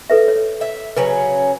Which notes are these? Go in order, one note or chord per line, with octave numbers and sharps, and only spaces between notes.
A4 B4 E5
C#5
E5
C#3 F#3 C#4 B4